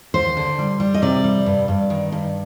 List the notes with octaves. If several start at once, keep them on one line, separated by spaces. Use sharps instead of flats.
D#2 C5
D3
G3
G3
D#5
C3 D5
G3
G2
G2
D#3
G2